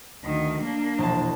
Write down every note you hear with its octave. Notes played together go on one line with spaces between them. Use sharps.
D2 D#3
A#3 D4
E1 A#1 A5